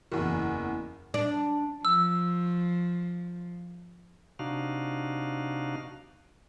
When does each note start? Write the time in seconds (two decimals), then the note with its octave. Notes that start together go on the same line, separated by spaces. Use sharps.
0.12 F#1 E2
1.14 D4
1.85 F3 E6
4.39 C3 D4 D#4 F#4 F5